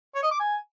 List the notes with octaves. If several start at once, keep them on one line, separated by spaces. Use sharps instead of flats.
C#5
D#5
D6
G#5